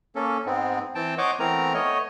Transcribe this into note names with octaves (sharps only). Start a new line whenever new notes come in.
A#3 C#4 A4
G#2 G#3 B3 C4
E3 C4 G5 A5
C5 C#5 D#5 F#5 C#6 D6
E3 A3 B3 C4 A#4 A#5
A3 B3 C#5 D#5